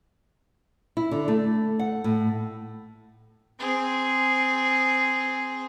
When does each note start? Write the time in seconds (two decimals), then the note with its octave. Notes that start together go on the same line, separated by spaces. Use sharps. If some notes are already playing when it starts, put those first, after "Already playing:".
0.97 E4
1.11 D3
1.28 A3
1.80 F#5
2.04 A2
3.59 C4 G#4